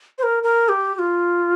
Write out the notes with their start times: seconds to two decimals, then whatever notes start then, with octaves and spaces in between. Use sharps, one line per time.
0.18 C5
0.23 A#4
0.43 A#4
0.69 G4
0.95 G4
0.99 F4